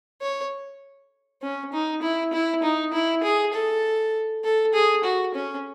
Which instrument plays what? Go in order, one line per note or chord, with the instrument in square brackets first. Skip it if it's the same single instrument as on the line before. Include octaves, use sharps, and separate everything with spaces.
[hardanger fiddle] C#5
C#4
D#4
E4
E4
D#4
E4
G#4
A4
A4
G#4
F#4
C#4